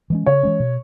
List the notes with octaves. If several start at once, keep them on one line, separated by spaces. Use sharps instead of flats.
E3 G#3 C#4
C#3 C#5
E3 G#3 C#4
B2